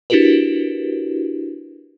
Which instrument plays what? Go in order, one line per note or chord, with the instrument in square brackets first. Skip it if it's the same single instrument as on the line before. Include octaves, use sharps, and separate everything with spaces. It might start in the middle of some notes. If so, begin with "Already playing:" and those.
[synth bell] D4 E4 F#4 G4 A#4 B4